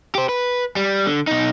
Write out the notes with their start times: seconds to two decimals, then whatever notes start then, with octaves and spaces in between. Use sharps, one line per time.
0.15 G4 C5
0.29 B4
0.76 G3
1.07 D3
1.27 B2 D#4